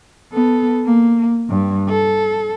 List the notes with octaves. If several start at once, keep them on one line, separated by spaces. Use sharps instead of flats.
B3 A4
A#3
G2
A4